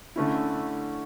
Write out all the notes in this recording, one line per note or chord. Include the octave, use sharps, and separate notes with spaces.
D3 A3 C#4 E4